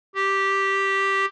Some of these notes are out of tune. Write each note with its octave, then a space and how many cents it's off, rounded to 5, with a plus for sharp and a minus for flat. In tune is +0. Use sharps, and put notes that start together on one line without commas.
G4 -5